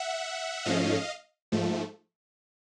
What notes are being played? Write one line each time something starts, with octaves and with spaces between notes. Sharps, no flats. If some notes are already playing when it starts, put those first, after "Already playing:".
Already playing: E5 F#5
G#2 F3 A3 C#4 D#5 F5
G#2 F3 A3